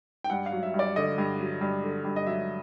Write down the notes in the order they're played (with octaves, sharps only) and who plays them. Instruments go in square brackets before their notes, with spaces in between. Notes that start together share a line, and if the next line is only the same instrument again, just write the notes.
[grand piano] G5
G2 F#5
F5
F#3
E5
G2
D5
D3 D#5
G2
F#3
G2
D3
G2
D#5
F#3 E5